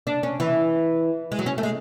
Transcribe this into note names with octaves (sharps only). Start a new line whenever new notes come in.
D4
C#4
E3
G#3
F#3
C#4
A3
G#3